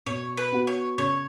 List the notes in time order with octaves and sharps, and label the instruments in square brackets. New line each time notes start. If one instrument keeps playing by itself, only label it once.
[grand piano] B2 [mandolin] C#5
[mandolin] B4
[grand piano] B3 F#4
[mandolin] C#5
[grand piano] C#3 [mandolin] C#5